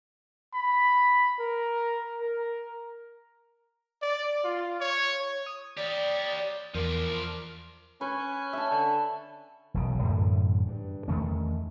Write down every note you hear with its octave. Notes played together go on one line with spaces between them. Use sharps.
B5
A#4
A#4
D5
F4
C#5
D#6
G4 C#5 D5
E2 F3 A#4 D5
C#4 B4
E5 A5
D3
E1 B1 E2 C#3
F#2 A2 D3 E3
G2
E2 D#3 A3 C#4